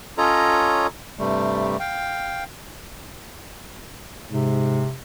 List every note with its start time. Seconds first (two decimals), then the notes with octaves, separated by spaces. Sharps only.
0.18 C#4 F4 A4 C#5 D#5 A#5
1.19 G2 C3 G3 A3
1.80 F5 G5
4.32 G#2 C3